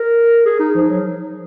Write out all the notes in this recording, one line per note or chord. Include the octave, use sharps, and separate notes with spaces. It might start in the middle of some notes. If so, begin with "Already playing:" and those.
Already playing: A#4
G#4
D#4
F3
F#3